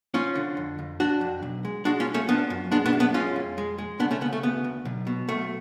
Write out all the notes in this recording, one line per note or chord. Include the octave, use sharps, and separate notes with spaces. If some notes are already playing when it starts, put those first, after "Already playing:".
F3 C#4 F4
D3
F2
F2
F2 D4 F#4
F2
B1
G#3
G#3 D4 F#4
C#4 F4
B1
A3 C#4
F3 B3 D4
F#2
G#3 B3 D4
B3 D4
F#2
B3 D4
G#3 C#4 F4
F2
G#3
G#3
C#3 B3 D4
A3 C#4
C#3 B3
A3
D2 B3
D2
B1
B2
B1 A3